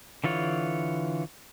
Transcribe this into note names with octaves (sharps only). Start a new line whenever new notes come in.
D3 E3 F4 C#5